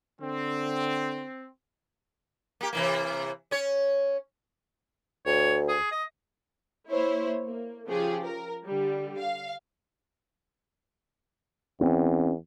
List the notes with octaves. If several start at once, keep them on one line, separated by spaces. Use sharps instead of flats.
D3 C4
A#3 G4
C3 E3 A#3
C#4 C#5
D2 C#5
G#4
D#5
A#3 E4 C5 C#5
A#3
C#3 F3 G4 G#4
A#4
D3 G3
F5
E2 C4 C#4